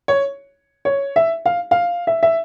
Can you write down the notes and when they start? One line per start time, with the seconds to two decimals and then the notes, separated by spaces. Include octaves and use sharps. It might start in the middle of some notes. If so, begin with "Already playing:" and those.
0.08 C#5
0.85 C#5
1.16 E5
1.46 F5
1.71 F5
2.07 E5
2.23 E5